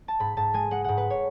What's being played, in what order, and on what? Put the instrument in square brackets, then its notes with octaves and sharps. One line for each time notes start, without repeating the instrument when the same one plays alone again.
[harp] A5
G#2 B5
G#2 A5
G#3 G#5
G#3 F#5
G#2 F#5
B4
C#5